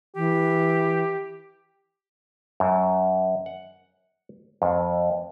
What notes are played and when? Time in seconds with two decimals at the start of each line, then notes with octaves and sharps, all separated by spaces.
0.16 E3 G4
2.60 F#2
3.46 F#5
4.62 F2